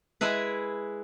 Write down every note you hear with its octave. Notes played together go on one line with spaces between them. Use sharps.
G#3 E4 G#4 B4